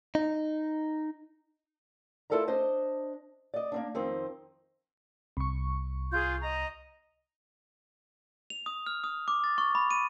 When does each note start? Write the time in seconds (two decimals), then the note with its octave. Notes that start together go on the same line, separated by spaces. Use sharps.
0.15 D#4
2.30 E4 F4 A4 A#4 D5 A#5
2.47 D4 C5 D#5
3.54 D5 D#5
3.72 A#3 C4 D4
3.95 F2 D#3 C4
5.37 C2 C#6
6.13 F4 G#4 G6
6.41 D#5 A#5
8.50 F7
8.66 D#6
8.87 F6
9.04 D#6
9.28 D6
9.44 A6
9.58 C#6
9.75 B5
9.91 D#7